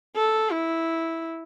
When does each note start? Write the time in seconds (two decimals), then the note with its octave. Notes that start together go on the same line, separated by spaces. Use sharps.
0.16 A4
0.52 E4